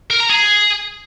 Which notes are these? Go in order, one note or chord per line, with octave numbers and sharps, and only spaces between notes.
A#4
A#5
G#4